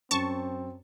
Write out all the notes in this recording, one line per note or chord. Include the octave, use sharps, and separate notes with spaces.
F#2 C4 A5 C#6